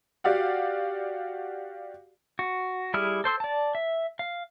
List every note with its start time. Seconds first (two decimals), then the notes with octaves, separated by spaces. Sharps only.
0.24 F#4 G4 D5 F5 F#5
2.39 F#4
2.94 G3 E4 G4 G#4 F6
3.24 A4 C5 C6 E6
3.40 D5 A5
3.75 E5
4.19 F5